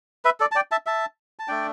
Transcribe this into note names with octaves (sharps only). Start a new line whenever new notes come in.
B4 E5
A4 D5
A5
D5 G5
E5 A5
E5 A5
A5
A3 D4 D5 G5